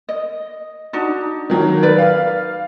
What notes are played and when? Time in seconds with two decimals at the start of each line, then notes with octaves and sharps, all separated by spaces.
0.09 D#5
0.93 D4 D#4 F#4
1.50 D#3 F#3 A#3
1.83 B4 D5
1.98 F5